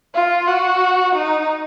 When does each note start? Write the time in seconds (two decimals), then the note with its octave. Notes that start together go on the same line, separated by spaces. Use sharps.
0.15 F4
0.47 F#4
1.15 D#4